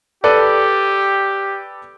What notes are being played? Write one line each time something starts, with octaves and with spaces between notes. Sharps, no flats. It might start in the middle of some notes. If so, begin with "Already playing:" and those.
G4 A4 B4 D5